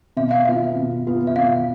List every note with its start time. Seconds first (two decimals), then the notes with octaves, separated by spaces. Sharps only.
0.17 B2 E5
0.31 F5
0.45 B3 F4 E5
0.76 B2
1.07 B3 F4
1.27 E5
1.36 B2 F5